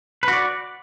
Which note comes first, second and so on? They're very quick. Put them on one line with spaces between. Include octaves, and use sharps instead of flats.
B4 F#4 D5